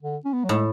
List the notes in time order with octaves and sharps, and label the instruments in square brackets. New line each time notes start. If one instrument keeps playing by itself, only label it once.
[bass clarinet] D3
C#4
B3
F#3
[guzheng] A2 [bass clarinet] G#3